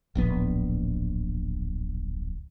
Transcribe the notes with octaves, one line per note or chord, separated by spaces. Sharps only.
D1 A#1 B3